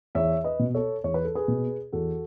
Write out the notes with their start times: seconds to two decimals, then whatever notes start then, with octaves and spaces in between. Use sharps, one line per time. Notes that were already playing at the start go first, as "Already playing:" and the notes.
0.15 E2 C#5 E5
0.44 B4 D#5
0.59 B2
0.74 A4 C#5
1.04 E2 C#5
1.14 B4
1.25 A4
1.35 G#4 B4
1.48 B2
1.93 E2 F#4 A4